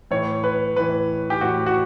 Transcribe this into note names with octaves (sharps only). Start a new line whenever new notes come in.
A2 E3 C#5
B4
A2 E3 B4
G4
A2 E3 F#4
F#4